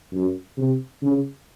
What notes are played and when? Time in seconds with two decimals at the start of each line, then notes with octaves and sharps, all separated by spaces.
0.13 F#2
0.57 C3
1.02 C#3